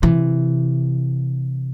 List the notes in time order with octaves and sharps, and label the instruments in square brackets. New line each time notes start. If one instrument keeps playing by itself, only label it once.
[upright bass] C3 E3